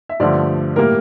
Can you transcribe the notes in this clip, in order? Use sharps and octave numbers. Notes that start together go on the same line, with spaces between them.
E5
G2 D3 F3 A3 D5
A2 G3 A#3 A#4